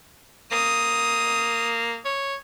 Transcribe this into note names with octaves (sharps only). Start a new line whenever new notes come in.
A#3 D#6
C#5